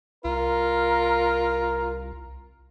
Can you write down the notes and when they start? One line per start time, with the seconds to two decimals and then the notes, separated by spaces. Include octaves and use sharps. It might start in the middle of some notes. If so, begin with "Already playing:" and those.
0.25 C2 F4 A#4